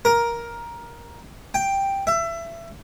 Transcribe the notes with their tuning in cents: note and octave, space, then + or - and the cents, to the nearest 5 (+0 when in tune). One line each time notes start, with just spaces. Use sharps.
A#4 +10
G5 +5
E5 +25